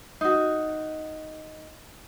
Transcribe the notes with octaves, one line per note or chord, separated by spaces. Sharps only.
D#4 F#4